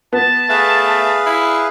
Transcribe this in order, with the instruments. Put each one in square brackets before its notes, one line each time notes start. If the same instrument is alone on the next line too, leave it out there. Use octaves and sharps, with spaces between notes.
[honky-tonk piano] B3 [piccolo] A5
[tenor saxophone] A3 [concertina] G#4 B4 F5
[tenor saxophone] E4